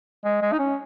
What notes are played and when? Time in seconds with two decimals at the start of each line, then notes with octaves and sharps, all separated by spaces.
0.24 G#3
0.42 G#3
0.53 D#4
0.59 C#4